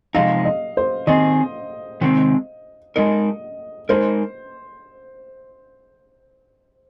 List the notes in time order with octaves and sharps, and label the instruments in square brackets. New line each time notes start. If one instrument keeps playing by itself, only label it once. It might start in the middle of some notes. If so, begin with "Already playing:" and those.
[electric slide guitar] C3 F3 G#3 D#4 [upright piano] F5
[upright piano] D#5
C5
[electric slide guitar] D#3 C4 G#4 [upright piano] D#5
[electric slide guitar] C3 D#3 G#3 C4
[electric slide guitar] G#3 D#4 A#4 [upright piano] D#5
[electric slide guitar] G#3 D#4 A#4 [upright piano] C5